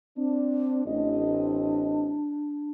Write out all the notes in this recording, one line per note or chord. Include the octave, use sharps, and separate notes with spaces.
C4 D4
A1 C4 D4 D#5